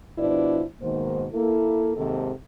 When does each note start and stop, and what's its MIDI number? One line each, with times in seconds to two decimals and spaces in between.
0.18 0.61 47
0.18 0.61 53
0.18 0.61 62
0.18 0.61 64
0.18 0.61 71
0.18 0.61 74
0.81 1.26 44
0.81 1.26 47
0.81 1.26 51
0.81 1.26 58
0.81 1.26 72
1.33 1.93 58
1.33 1.93 64
1.33 1.93 69
1.95 2.31 39
1.95 2.31 44
1.95 2.31 48
1.95 2.31 51
1.95 2.31 69